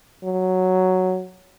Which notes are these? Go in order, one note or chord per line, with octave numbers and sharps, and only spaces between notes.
F#3